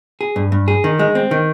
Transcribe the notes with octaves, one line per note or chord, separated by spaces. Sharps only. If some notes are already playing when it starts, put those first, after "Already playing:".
G#4
G2
G2
G#4
D#3
G#3
C4
D#3